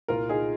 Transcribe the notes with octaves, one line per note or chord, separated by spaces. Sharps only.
C2 A#2 F4 A#4
D#4 G#4